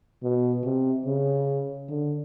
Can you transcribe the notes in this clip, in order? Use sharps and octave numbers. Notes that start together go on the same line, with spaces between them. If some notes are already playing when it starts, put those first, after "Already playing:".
B2
C3
C#3
D3